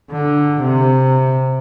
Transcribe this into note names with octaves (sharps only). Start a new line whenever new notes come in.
D3
C3